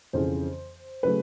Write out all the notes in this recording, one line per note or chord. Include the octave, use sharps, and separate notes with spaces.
F2 C#3 E3 C5
C#3 F#3 A3 B4